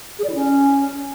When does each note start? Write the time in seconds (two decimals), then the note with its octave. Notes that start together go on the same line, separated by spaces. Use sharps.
0.19 G#4
0.24 D5
0.29 E4
0.35 C#4